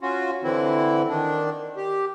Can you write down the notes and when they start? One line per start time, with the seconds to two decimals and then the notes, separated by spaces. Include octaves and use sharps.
0.01 C#4 F4 F#4
0.44 D3 E3 C4 E4
1.09 D#3 D4
1.77 G4